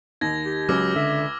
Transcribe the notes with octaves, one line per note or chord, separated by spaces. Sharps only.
D#2 G#6 A#6
G4
C#2 F#3 D6 E6 F6
D3 E5